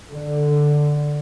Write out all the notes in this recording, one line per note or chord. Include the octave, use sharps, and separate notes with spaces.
D3